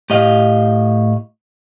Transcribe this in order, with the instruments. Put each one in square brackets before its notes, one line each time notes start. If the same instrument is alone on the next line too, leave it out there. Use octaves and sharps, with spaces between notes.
[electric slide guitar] A2 G4 D#5 F5